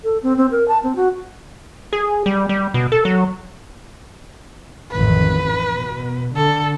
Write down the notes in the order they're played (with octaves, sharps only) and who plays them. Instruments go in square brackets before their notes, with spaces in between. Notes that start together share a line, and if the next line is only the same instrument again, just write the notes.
[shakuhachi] A4
C4
C4
A#4
A5
C4
F#4
[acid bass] G#4
G3
G3
B2
A4
F#3
[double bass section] A1 F2 D#3 [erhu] B4
[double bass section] B2
[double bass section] D3 [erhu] A4